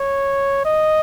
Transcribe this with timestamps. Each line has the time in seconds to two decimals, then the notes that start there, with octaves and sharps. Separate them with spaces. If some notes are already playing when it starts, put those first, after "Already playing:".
Already playing: C#5
0.65 D#5